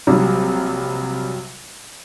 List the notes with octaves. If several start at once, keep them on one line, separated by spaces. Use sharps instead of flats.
A#1 C3 F#3 G3